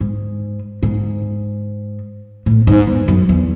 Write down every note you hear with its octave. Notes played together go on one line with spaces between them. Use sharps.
G#2
G#2
A2
G#2
E2
F#2
E2